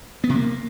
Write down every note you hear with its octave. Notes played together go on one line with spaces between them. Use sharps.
B3
C3
A#3